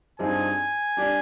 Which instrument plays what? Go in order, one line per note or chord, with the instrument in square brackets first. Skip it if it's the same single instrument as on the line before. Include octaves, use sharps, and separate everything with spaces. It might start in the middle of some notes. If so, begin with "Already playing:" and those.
[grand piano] G2 F3 C4 D#4 G#4 [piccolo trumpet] G#5
[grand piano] G3 D4 G4 D5